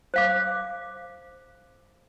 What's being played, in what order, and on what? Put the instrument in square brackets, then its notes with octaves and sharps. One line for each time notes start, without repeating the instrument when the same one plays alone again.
[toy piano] C5 F5 D6